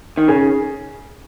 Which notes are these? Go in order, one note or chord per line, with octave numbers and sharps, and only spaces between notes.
D#3
C#3 G#4